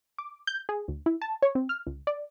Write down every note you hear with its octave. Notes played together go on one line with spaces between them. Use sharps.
D6
G6
G#4
D2
E4
A5
C#5
C4
F6
C#2
D5